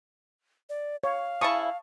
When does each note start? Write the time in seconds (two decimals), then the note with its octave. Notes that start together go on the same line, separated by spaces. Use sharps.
0.69 D5
1.04 C#5 F5
1.41 C#3 E4 A5 C#6 D#6